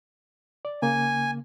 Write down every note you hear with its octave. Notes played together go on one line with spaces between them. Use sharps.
D5
C#3 A#3 G#5